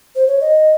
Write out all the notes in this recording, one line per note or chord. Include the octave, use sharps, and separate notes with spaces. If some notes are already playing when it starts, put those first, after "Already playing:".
C5
C#5
D#5